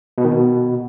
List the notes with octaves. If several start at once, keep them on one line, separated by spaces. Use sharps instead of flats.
B2
D#3
B2